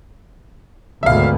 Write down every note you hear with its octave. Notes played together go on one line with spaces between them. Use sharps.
G#1 D2 B2 E5 F5